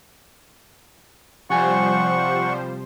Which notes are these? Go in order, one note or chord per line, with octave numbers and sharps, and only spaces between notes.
C3 F3 G3 C5 F#5 G#5 C#6